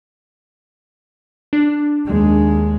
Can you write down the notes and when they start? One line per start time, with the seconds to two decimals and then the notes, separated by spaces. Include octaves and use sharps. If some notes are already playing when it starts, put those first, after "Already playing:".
1.53 D4
2.06 D#2 G#3